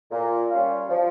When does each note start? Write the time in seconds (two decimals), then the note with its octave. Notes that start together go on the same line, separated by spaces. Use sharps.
0.11 A#2
0.50 G3 C#4 F4
0.89 F3